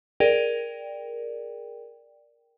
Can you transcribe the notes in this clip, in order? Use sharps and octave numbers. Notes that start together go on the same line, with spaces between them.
G#4 A#4 D5 G5